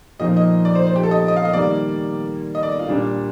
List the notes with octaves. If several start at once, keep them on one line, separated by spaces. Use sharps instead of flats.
A#2 F3 A#3 D#4 D#5
D#5
D5
C5
C5
G4
A4
D#5
D#5
F5
D#5
D#3 G3 A#3 D5
D#5
D5
F4
A#2 G3 D4